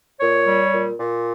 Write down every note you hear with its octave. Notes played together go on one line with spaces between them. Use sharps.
A#2 C#5
G3
A#2
A#2